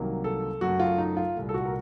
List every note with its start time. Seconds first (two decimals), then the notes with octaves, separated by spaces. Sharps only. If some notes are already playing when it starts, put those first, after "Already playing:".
Already playing: C2 C3 D#3 F#3 A#3
0.24 A4
0.61 F#2 C#3 A3 F#4
0.80 F4
0.98 D#4
1.17 F4
1.35 C2 A#2 A3
1.49 A4
1.54 F#4
1.65 A#4